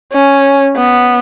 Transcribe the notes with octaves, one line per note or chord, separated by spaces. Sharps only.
C#4
B3